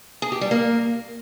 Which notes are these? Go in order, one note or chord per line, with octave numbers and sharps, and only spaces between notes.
G#4
G4
G3
A#3